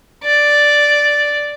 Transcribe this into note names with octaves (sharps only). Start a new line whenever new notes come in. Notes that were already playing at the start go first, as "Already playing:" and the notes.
D5